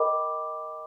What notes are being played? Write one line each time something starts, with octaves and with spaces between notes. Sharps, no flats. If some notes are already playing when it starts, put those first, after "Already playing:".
Already playing: A#4 D#5 G5 B5 D6